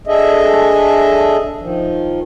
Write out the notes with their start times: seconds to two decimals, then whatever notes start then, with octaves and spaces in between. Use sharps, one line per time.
0.07 D4 G#4 A4 D#5 E5
1.61 D#3 F3